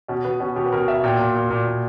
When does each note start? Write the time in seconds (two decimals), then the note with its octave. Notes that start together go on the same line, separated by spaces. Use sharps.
0.08 B2 C#4
0.25 B2 B3
0.40 B2 C#4
0.56 B2 G4
0.65 B4
0.72 B2 A#4
0.88 B2 E5
1.04 A#2 G5
1.19 A#2
1.35 A#2
1.50 A#2
1.67 A#2